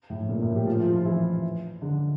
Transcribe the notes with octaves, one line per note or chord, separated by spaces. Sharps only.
A2 A3
A#2 A#3
A2 A3
G3 G4
F3 F4
F3 F4
F3 F4
E3 E4
D3 D4